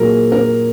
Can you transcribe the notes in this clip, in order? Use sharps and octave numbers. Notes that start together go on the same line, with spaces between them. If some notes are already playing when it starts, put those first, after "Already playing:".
Already playing: A#2 F#3 G#4 A#4
A#4